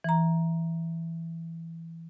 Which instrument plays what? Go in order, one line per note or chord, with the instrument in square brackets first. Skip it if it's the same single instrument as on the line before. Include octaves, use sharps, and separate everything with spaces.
[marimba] E3 A#5